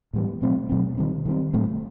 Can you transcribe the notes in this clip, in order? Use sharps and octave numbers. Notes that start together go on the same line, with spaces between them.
A2 E3 G3 B3
B2 F#3 A3 C4
B2 F#3 A3 C4
D#3 G3 C4
D#3 G3 C4
A2 F#3 A3 C4